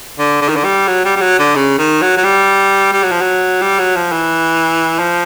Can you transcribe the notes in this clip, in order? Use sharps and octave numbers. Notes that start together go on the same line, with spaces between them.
D3
D3
D#3
D3
G3
F#3
G3
G3
F#3
D3
C#3
D#3
F#3
F#3
G3
G3
F#3
F3
F#3
G3
F#3
F3
E3
F3